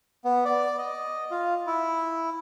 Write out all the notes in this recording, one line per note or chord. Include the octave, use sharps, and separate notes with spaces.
B3
D5
D#5
F4
E4